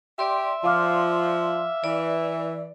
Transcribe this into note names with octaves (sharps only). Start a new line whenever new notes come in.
G4 D5 E5 C6
F3 F5 D6 F6
E3 D5